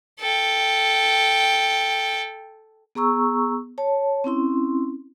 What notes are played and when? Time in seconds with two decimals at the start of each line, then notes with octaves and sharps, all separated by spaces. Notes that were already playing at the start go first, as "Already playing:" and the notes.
0.20 A4 G5
2.95 B3 G#4 A#5 C#6 E6
3.78 C#5 A5
4.24 C4 C#4 E4 C6